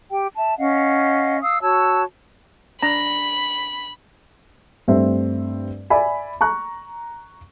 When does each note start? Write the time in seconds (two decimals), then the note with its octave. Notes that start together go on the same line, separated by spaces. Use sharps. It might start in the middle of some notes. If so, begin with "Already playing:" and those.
0.11 G4 G5
0.36 E5 A5
0.58 C#4 D#5 F5 F#5
1.42 F5 D#6 E6
1.61 F#4 C#5 A5 E6
2.83 D4 A#5 B5
4.88 G2 A3 C4 E5
5.90 D5 E5 G#5 B5
6.41 A#5 C#6 F#6